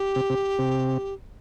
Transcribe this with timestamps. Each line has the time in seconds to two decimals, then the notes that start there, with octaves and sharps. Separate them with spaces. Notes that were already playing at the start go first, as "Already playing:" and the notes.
Already playing: G4
0.16 C3
0.30 C3
0.59 C3